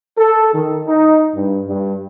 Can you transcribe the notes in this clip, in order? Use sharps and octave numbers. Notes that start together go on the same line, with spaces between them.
A4
D#3
D#4
G2
G2